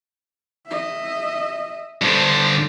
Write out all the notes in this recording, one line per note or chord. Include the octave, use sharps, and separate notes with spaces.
D#5 E5
G2 D3 C5